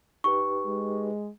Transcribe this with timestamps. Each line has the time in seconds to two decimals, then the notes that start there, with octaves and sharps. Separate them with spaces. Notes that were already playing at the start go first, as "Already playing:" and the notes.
0.24 D#4 G4 B4 C#6
0.66 G#3